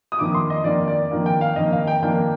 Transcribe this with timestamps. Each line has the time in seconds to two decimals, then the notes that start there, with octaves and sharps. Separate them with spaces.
0.12 D#6
0.19 F2 D#3 A#3 D6
0.34 C6
0.50 D#5
0.64 F2 D#3 A#3 D5
0.88 D5
1.11 F2 D#3 A#3
1.26 G5
1.41 F5
1.56 F2 D#3 A#3 D#5
1.73 F5
1.87 G5
2.02 F2 D#3 A#3 D4 G5